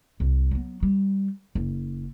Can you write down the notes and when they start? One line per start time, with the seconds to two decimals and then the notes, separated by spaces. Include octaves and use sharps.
0.20 C2
0.51 F#3 B3
0.83 G3
1.55 F#1